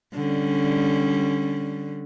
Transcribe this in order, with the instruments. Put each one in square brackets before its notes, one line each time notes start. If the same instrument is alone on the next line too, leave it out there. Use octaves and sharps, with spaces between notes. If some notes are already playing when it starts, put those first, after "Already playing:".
[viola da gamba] D3 G3 C#4